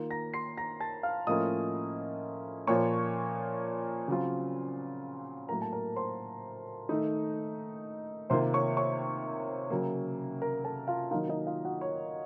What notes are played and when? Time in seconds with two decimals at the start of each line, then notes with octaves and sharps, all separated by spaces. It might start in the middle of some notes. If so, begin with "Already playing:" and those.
Already playing: D#3 A#3 F4
0.11 A#5 A#6
0.34 C6 C7
0.58 A#5 A#6
0.80 A5 A6
1.03 F5 F6
1.27 A2 F3 A#3 C#4 F4 D#5 D#6
2.67 A#2 F3 A#3 F4 C#5 C#6
4.08 C#3 F#3 C4 F4
5.49 A2 F#3 A#3 A#4 A#5
5.62 A5
5.73 A#4 A#5
5.96 C5 C6
6.89 D#3 A3 D#4
8.30 C3 D#3 A#3 F4 C5 C6
8.53 C#5 C#6
8.77 C#5 C#6
9.70 C#3 F#3 A#3
10.42 A#4 A#5
10.64 A4 A5
10.88 F4 F5
11.11 D#3 F#3 A#3 D#4 F4 F5
11.29 D#4 D#5
11.47 F4 F5
11.65 F#4 F#5
11.81 C#5